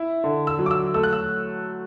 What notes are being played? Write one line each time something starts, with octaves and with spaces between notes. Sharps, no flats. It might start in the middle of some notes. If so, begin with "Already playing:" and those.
Already playing: E4 E5
D3
E6
F#3
D6
E6
A3 E6
F#6
E6